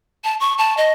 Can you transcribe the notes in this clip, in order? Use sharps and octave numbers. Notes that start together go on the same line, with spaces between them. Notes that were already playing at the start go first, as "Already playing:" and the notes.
A5
C#6
A5
D#5